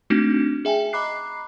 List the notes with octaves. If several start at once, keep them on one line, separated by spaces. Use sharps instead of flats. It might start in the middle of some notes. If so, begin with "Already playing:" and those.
A3 C4 D4 D#4 F#4
G#4 E5 G5 G#5
D#5 A#5 B5 D6 F#6 C7